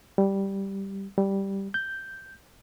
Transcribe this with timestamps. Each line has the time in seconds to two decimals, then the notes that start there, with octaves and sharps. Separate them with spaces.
0.18 G3
1.18 G3
1.74 G6